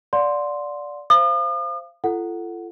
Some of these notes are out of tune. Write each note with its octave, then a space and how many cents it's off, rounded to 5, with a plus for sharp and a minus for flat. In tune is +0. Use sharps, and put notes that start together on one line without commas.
D5 -10 F#5 -40 C6 +0
C5 +0 F5 -30 D#6 -45
F4 -35 A4 +0 F#5 +0